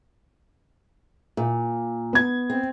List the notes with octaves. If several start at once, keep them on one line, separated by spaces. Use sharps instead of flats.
A#2
B3 G#6
C4